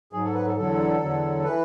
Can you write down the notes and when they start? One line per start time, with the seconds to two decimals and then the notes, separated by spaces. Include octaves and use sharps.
0.13 G#2 F#3 G#4
0.25 A4
0.34 B4
0.46 A4
0.57 E2 D3 F#3 A4
1.01 E2 D3 F#3
1.44 E3 B4